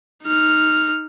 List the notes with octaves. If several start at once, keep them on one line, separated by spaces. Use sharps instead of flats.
D#4 F6